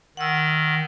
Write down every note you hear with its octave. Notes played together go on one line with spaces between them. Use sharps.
D#3 F#5 E6